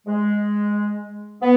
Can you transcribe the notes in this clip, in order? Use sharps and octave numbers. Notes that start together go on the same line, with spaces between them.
G#3
B3